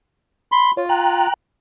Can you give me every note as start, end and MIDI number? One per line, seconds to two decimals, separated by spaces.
0.52 0.71 83
0.52 0.71 84
0.77 1.26 65
0.77 0.86 73
0.89 1.34 79
0.89 1.34 82
0.89 1.34 90